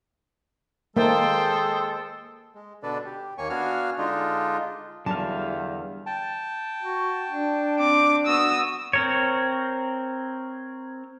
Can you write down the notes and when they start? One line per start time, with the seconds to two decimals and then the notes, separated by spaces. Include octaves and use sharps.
0.97 G#3 A#3 A4 C5 G5
2.55 G#3
2.83 B2 D3 D4 A4 B4 D5
3.05 G4
3.38 D#2 A#3 C#5 G#5 C#6
3.50 B3 D4 F#4 F5 G#5 F6
3.98 D3 G#3 D4 D#4 F4
5.06 E2 D3 F#3 G3 E4 F5 A5
6.06 G5 A5
6.83 F#4
7.29 D4
7.78 C4 D6
8.27 B3 F#4 D#6 E6
8.93 C4 A#4 C#5